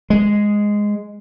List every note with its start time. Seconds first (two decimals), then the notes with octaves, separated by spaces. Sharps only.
0.10 G#3